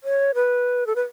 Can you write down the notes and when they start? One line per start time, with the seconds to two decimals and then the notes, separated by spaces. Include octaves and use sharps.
0.04 C#5
0.35 B4
0.87 A4
0.96 B4